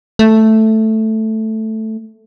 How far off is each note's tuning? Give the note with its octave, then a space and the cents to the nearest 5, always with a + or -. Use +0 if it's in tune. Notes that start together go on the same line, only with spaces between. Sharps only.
A3 +0